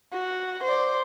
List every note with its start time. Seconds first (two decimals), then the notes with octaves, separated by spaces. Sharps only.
0.13 F#4
0.64 C5 D5